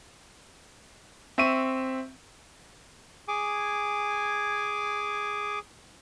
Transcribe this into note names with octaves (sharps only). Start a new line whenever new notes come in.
C4 E5 C#6 D#7
G#4 G#5 D6